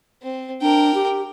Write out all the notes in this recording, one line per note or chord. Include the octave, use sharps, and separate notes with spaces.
C4
D4 A#4 G5
G4